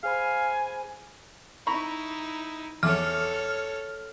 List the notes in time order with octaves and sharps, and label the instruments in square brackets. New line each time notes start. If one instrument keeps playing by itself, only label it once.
[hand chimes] G#4 C5 B5 [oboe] F5 [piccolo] G#5
[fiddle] D#4 E4 [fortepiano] A#5 B5 C#6
[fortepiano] E2 E3 D6 [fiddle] A4 C#5 [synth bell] F6